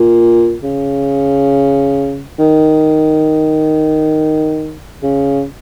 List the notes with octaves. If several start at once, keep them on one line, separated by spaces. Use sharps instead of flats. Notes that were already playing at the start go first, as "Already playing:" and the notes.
Already playing: A#2
C#3
D#3
C#3